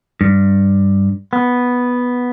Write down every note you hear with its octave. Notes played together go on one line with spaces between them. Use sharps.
G2
B3